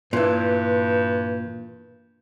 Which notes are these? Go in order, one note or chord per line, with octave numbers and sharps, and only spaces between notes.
G2 A#2 E3